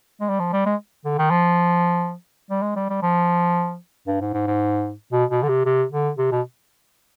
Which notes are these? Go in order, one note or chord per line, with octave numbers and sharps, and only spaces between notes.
G#3
G3
F3
G3
G#3
D3
D#3
F3
G3
G#3
G3
G3
F3
G2
G#2
G#2
G#2
B2
B2
D3
C3
C3
D3
C3
B2